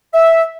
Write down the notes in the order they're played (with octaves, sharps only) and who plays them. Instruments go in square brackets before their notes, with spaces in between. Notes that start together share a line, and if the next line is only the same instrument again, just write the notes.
[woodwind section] E5